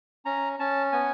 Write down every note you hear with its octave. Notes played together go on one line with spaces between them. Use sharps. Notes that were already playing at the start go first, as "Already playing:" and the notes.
C#4 A#5
C#4 A5
B3 G#5